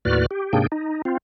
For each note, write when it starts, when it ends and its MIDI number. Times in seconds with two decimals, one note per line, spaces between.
0.05 0.26 39
0.05 0.26 45
0.05 0.26 66
0.05 0.26 71
0.05 0.26 74
0.05 0.26 89
0.31 0.52 67
0.53 0.67 44
0.53 0.67 48
0.53 0.67 58
0.53 0.67 62
0.53 0.67 68
0.53 0.67 79
0.72 1.02 63
1.05 1.18 60
1.05 1.18 65